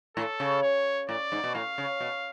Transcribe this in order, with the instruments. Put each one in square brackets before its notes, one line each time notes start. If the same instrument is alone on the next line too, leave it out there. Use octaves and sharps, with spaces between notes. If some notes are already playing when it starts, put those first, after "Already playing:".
[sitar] A2 [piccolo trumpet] A4
[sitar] C#3
[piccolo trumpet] C#5
[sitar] A2 [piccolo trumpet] D5
[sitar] G#2
B2
[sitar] A2 [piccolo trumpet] F5
[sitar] C#3
B2